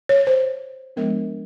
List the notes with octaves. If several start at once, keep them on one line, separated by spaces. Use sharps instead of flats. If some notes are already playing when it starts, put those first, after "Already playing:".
C#5
C5
F3 G#3 B3 D4 A#4